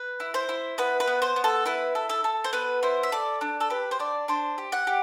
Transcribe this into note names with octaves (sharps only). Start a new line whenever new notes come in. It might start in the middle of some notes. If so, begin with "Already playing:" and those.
Already playing: B4
E4
C5
E4
B3 B4
B4
B3
C5
B3
A4
E4 B4
A4
A4
A4
C5
B3 B4
E4 C5
E5
A4 D5
D4
A4
G4 B4
C5
D4 D5
D4 C5
G4
F#5
G4